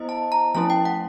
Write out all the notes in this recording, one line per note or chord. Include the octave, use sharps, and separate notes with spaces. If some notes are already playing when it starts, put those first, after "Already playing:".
Already playing: B3 E4 C5 D#5
A5
A#5
F3 A3 C#4 E4 A5
G5
F#5